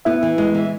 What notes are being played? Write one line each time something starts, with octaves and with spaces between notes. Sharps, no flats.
B3 E4 E5
E3
G#3
E3